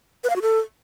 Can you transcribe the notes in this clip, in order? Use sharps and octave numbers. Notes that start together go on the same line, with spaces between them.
B4
F5
F#4
A4